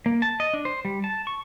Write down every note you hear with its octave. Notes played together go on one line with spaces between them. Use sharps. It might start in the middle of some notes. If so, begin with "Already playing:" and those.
A#3
A5
D#5
D4
C5
G3
A5
C#6